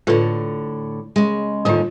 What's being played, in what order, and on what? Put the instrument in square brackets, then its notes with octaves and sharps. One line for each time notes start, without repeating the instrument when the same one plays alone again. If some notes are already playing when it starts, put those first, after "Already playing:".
[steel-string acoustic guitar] A2 D3 [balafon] F4 A4 B4
[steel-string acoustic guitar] C#3 G#3
[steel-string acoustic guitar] D#2 G#2 D3 [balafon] G3 F4